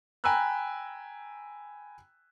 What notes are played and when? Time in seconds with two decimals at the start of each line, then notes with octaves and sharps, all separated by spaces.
0.24 G5 G#5 A#5 B5 E6 F#6